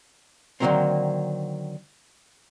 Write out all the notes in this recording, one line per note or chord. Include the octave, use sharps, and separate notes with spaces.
D3 D#3 F3 F#3 A#3 C4